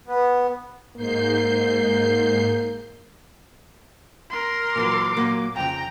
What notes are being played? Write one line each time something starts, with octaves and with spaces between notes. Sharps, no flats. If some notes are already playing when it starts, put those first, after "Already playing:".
B3
G#2 A#3 G6 C7
A#4 C6
A#2 E3 F#3 D6
A#2 F#3 A#3
F2 C#3 G5 A#5